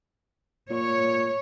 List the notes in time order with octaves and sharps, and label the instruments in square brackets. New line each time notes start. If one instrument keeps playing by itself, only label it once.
[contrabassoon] A#2 [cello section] C#5